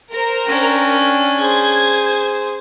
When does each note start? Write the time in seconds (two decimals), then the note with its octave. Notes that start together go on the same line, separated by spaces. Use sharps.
0.13 A#4 C5 A#5
0.47 C#4 D4 G5
1.40 G#4 C5 G#6